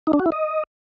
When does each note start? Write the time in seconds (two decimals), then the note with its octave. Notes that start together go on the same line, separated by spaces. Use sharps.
0.07 D#4
0.13 D4
0.20 F#4
0.26 E4
0.32 D#5